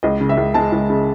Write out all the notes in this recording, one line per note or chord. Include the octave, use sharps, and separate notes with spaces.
C#2 D#5
C#3
E5
C#2
G#3 A5
C#2
C#3